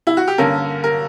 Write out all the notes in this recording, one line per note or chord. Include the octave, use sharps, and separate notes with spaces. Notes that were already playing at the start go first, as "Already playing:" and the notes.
E4
F#4
G4
G2 D3 A#3 C#4 A#4
A#4